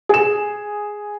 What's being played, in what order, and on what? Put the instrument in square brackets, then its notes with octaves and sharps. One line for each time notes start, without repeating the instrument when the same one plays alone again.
[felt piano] G#4 E7